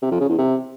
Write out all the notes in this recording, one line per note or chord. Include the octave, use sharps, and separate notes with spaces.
C3
F2
C#3
E2
C3